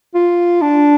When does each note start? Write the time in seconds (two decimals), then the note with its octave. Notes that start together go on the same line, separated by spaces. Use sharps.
0.15 F4
0.62 D4